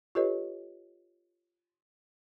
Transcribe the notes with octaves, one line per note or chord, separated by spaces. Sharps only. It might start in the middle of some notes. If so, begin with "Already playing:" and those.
F4 G4 A4 B4 C#5 D#5